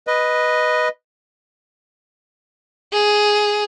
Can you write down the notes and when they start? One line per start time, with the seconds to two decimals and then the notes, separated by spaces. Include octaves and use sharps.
0.07 B4 D#5
2.92 G#4